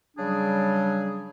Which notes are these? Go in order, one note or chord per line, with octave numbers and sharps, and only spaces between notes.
C#3 F#3 G3 D4 G#4